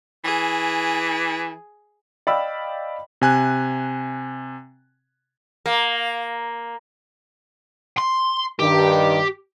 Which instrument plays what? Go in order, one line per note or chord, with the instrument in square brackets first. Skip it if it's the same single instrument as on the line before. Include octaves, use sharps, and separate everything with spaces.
[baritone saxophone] E3 [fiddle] G#4
[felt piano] D5 D#5 F5 G5 B5 E6
[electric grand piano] C3 G#5 F#6
[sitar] A#3
[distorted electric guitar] C6
[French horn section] G2 D#3 [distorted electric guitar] G4